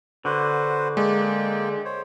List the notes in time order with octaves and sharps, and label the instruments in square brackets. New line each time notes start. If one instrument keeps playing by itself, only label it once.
[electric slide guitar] D3 [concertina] F#4 B4 C5
[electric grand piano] G#3 [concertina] A#3 D5 G5
[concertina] C5 C#5